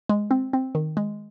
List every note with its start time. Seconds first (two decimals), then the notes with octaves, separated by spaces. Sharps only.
0.09 G#3
0.31 C4
0.53 C4
0.75 D#3
0.97 G#3